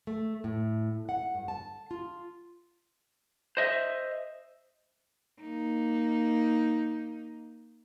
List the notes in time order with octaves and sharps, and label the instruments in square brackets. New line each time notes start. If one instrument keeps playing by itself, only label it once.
[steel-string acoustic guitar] A3
A2
F#5
G2
A5
F4
[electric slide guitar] C5 D#5 E5
[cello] A#3 D#4